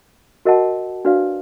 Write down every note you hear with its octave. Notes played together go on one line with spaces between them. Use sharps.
F#4 A#4 D#5 F#5 A5
D4 F#4 B4 D5 F5